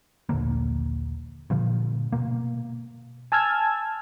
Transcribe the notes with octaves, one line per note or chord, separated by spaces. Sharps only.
D#1 A#1 D3 A#3
G2 A#2 D3 F3
B2 A#3
G#5 A5 E6 F6 G#6